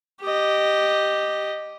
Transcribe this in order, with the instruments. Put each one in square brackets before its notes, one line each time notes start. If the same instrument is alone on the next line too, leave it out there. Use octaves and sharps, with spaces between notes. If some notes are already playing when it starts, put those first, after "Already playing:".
[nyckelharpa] G4 D#5